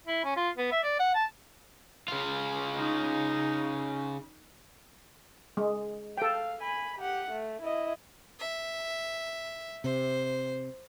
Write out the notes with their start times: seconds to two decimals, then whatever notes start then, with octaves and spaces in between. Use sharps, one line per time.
0.07 E4
0.24 C#4
0.37 F4
0.57 B3
0.72 E5
0.83 D5
1.00 F#5
1.15 A5
2.08 C#3 F4
2.76 D#4
5.57 G#3
6.17 A4 F5 G5
6.62 G#5 B5
6.99 G4 F#5
7.31 A3
7.62 E4 D#5
8.39 E5
9.84 C3 C5